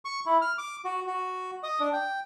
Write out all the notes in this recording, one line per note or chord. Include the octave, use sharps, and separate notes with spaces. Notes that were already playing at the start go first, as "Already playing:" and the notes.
C#6
E4
F6
D6
F#4
F#4
D#5
D4
G5